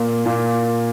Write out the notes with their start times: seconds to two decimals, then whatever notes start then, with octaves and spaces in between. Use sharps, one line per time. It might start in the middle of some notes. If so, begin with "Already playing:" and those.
Already playing: A#2 A#3
0.25 A#2 A#3